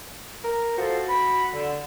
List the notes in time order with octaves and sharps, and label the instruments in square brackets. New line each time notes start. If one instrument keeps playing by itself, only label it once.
[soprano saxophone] A#4
[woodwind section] F3 A4 C5 [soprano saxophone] F#4
[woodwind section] B5
D3